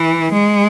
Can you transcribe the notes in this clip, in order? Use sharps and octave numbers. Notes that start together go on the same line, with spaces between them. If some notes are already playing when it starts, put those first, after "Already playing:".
Already playing: E3
G#3